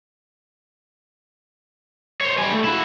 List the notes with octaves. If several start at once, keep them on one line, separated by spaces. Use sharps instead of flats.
C5 C#5
G3 G#5
A3
E4 F#4